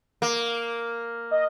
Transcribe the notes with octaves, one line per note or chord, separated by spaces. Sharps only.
A#3
D#5